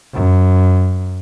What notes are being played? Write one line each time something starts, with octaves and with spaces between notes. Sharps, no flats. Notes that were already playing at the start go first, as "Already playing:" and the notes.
F#2